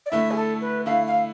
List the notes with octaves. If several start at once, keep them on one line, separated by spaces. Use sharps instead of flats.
D5
D3 A3 E4 E5
G#4
A4
B4
D3 A3 E4 F5
F5